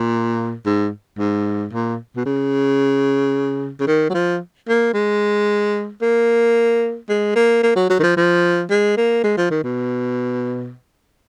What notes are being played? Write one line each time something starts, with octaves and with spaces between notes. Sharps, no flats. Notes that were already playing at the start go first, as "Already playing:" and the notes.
Already playing: A#2
G#2
G#2
A#2
B2
C#3
C#3
D#3
F#3
F3
A#3
G#3
A#3
G#3
A#3
A#3
F#3
F#3
D#3
F3
F3
G#3
A#3
G#3
F3
D#3
B2